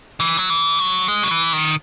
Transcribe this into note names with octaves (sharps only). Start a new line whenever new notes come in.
E3
F#3
E3
F#3
G#3
F#3
E3
D#3